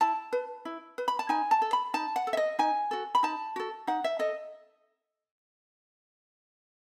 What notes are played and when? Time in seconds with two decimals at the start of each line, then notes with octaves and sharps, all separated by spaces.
0.01 E4 A5
0.33 B4
0.65 E4
0.98 B4
1.08 B5
1.19 A5
1.29 D#4 G#5
1.51 A5
1.62 A4
1.73 B5
1.94 D#4 A5
2.16 F#5
2.27 A4
2.33 E5
2.37 D#5
2.59 D#4 G#5
2.91 F#4 A4
3.15 B5
3.23 D#4 A5
3.56 F#4 A4
3.87 D#4 F#5
4.04 E5
4.19 A4 D#5